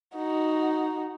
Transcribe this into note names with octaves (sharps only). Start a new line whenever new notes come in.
D#4 F#4